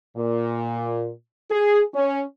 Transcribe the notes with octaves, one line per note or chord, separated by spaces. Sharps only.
A#2
G#4
C#4